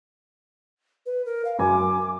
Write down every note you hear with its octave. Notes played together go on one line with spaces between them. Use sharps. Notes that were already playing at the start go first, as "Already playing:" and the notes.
B4
A#4
F5
F#2 G#5 D6